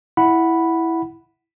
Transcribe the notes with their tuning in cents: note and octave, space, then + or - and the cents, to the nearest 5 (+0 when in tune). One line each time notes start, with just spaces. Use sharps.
E4 +0 F#5 +0 B5 +0